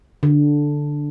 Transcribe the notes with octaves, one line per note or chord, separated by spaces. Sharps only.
D3